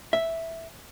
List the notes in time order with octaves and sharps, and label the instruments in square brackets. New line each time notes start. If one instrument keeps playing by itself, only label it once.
[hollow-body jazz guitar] E5